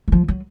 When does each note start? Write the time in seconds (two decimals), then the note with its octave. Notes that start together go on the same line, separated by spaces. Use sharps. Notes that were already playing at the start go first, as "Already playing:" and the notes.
0.08 F#3
0.12 F3
0.28 F#3